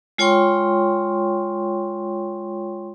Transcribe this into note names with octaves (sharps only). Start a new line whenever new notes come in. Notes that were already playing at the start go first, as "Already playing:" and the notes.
G#3 F4 C#5 G5 C6 C#6